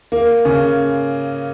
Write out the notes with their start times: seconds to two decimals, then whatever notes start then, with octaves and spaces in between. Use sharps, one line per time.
0.12 A#3
0.45 C#3 C#4